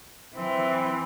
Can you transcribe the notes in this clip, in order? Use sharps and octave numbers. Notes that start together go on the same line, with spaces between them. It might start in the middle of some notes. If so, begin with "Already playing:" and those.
E3 C4